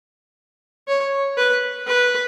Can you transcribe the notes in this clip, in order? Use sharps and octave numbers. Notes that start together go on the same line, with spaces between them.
C#5
B4
B4